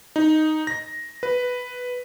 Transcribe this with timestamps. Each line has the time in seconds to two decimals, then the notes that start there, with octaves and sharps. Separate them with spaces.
0.16 D#4
0.67 A#6
1.23 B4